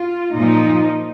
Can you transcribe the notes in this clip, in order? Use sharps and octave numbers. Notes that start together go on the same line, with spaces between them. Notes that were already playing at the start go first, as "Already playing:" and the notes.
Already playing: F4
A#2 F3 D#4